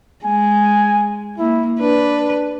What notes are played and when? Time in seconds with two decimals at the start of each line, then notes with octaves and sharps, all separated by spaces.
0.25 G#3 G#5
1.39 A#3 E4
1.80 D4 B4